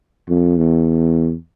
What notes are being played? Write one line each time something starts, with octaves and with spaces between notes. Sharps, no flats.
F2
E2